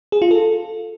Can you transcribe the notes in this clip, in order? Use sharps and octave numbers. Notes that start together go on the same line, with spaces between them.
G#4
F4
A4